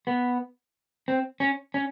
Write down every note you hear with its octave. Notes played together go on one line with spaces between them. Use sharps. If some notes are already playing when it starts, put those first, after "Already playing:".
B3
C4
C#4
C#4